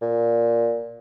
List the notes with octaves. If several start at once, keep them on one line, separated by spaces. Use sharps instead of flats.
A#2